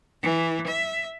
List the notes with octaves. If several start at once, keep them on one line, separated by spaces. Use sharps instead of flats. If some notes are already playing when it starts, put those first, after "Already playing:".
E3
E5